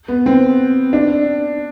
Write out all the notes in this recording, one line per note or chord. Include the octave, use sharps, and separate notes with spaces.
B3
C4
D4